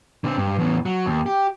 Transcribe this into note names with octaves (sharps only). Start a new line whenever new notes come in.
D3 C4
G2
E2 A2
F#3
D#2
G4